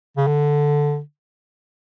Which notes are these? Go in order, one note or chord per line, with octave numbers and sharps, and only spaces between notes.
C#3
D3